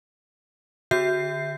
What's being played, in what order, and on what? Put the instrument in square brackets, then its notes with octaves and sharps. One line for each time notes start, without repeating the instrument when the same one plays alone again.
[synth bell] D3 F#4 E5 G6 C7